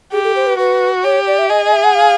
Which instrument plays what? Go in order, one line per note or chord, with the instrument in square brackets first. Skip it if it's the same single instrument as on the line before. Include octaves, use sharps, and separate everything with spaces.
[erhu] G4 [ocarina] G#4
[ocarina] A4
C5
B4
[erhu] F#4 [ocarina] B4
[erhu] G4 [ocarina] C#5
[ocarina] D5
E5
[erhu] G#4 [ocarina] D#5
[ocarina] D#5
E5
F#5
F5